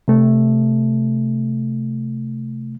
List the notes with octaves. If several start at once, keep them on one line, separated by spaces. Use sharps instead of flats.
C3 A3